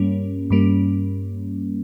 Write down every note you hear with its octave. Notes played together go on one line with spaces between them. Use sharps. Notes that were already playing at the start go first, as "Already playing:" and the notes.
Already playing: G2 G3 A#3 C#4
G2 G3 A#3